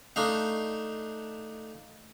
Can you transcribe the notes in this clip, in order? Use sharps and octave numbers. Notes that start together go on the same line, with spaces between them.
A3 D4 D#4 F5